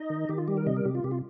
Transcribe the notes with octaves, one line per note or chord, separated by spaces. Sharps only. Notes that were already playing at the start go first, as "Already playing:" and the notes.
Already playing: D#4 D#5
D#3
D#3 G4
F4
G3 G4
A#4
C3 D#5
A#4
C3 G4
F4
C3 G4
F4